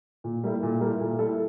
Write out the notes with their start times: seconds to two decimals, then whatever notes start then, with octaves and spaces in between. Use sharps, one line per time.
0.24 A#2
0.43 G3 A#3 E4 A4
0.63 A#2
0.81 G3 A#3 E4 A4
1.01 A#2
1.19 G3 A#3 E4 A4